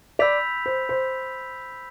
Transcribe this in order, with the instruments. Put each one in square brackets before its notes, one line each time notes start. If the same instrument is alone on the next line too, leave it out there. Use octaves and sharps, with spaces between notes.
[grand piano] D5 [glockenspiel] B5 E6 G6 B6 F7
[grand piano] C5
C5